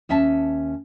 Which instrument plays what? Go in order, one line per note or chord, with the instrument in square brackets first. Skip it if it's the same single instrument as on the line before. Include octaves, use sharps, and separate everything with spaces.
[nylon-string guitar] D#2 C#4 E5 A5